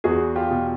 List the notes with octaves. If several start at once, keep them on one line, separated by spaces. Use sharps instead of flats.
E2 F#4 G#4
F4 G4
B2